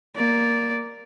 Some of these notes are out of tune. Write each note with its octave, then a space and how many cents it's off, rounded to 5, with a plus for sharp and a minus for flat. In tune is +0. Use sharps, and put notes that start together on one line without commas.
A#3 +0 D5 -10